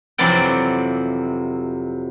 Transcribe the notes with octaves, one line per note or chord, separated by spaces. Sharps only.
F2 C3 E3 F#3 D5 G5